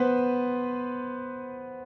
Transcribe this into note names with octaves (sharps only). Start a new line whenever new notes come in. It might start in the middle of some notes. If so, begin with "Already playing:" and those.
Already playing: B3 B4 C5